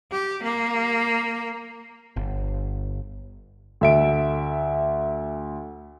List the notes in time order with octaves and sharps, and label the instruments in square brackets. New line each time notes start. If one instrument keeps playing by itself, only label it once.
[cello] G4
A#3
[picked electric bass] G1
[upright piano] D2 E5 D7